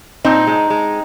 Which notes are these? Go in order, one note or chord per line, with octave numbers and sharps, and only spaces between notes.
A#2 C4 D#4
G#3
G#3